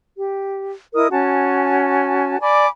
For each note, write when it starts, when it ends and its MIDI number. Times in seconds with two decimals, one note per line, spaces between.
0.17 0.71 67
0.96 1.08 64
0.96 1.08 70
0.96 1.08 75
0.96 1.08 87
1.11 2.40 61
1.11 2.40 66
1.11 2.40 80
1.11 2.40 81
2.41 2.67 74
2.41 2.67 80
2.41 2.67 83
2.41 2.67 86